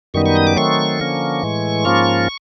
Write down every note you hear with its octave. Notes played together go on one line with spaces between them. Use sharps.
F#2 D#3 G3 B3 D#4 C#6
C#6
D#6
D6
D#3 F#3 A3 C4 C#6
D3 F3 A#3 C#4
A2 E3 G#3
G#2 F3 A#3 C#4 F4